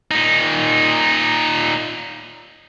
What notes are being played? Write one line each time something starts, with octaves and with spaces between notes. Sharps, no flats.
A#2 D#4